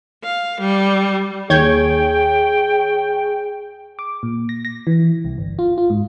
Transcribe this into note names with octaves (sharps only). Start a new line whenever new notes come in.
F5
G3
D#2 G#4 C#5 G5 G6 G#6
D6
A#2
A#6
A#6
E3
C2
G1
F4
F4
G#2